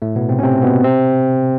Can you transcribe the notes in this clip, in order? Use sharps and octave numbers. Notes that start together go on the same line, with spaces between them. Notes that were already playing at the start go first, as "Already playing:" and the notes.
A2 A3
B2 B3
C3 C4
C#4
C3 C4
B2 B3
C3 C4